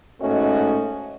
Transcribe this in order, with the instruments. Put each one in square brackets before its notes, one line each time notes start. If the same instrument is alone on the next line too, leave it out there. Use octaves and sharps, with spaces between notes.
[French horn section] G#2 A3 C#4 F#4 D#5